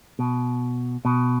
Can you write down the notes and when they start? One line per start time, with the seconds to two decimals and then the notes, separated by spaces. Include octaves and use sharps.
0.19 B2
1.05 B2